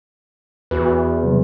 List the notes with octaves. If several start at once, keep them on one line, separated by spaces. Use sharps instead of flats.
E2 F#4 B4
C3 F#3 G3